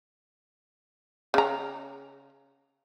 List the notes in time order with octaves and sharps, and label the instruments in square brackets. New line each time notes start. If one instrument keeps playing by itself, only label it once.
[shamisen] C#3 A#5